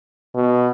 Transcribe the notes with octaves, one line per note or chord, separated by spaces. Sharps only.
B2